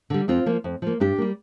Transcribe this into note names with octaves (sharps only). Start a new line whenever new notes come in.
D3 G3
F2 C4 F4
F3 A#3
F2
F3 A#3
G2 D4 G4
G3 A#3